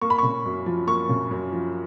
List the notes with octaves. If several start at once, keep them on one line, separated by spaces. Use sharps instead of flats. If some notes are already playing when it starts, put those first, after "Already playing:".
A#3 C#6
B5
C#3 C#6
F#2
F3
A#3 C#6
C#3
F#2
F3